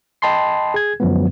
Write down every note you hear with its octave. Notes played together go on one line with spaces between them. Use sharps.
D#5 G5 A5 B5 C6 C7
G#4 G#6
F#2 D3 F3 F#3 G#3 B3